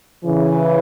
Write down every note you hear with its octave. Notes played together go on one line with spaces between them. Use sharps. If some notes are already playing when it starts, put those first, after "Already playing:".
C#3 E3